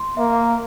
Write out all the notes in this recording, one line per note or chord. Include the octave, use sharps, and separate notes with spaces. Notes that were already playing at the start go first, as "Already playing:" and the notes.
Already playing: C6
A#3 E5